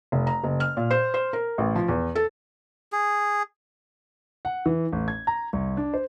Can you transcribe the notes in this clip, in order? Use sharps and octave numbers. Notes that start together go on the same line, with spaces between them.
F1
A#5
F#1
F6
A#2
C5
C5
A#4
A1
F3
E2
A4
G#4
F#5
E3
A1
G#6
A#5
C2
D4
C5